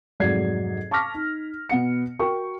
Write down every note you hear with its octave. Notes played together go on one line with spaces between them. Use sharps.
F1 G#2 F#3 D5 G#6 C7
A5 C#6 D6 F6 A#6 B6
D#4
B2 B3 F#5 C#7
F#4 A#4 G5 C#6